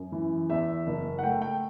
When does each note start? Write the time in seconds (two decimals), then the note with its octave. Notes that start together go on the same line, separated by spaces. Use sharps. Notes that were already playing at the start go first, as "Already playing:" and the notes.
Already playing: F#2
0.12 E3
0.49 E2 E5
0.87 F#1
1.19 F#5
1.23 A3 G5
1.42 G5